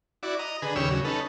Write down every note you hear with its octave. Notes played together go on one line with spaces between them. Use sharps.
E4 F#4 D5
D#5 A#5
D3 G#4 B4
D#2 C#3 G4 C#5 E6
C#3 F#3
C#4 D#4 A4 B4